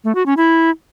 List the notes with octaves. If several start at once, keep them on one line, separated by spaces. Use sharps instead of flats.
A3
F#4
C#4
E4